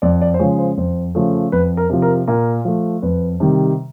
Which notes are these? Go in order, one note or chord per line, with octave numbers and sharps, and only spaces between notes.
F2 D5
D5
C5
C#3 F3 G#3 C#5
C5
F2 C5
C#3 F3 A3
F2 B4
A#4
C3 F3
A#4
A#2 A#4
F3 A3
F2 B4
C3 D#3 G3